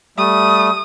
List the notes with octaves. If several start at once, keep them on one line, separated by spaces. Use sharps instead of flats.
G3 A3 D#6